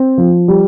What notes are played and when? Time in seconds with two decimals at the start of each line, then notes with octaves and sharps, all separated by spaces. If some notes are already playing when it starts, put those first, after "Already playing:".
Already playing: C4
0.18 F3
0.48 G3